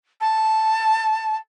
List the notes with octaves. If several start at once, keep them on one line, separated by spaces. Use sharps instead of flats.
A5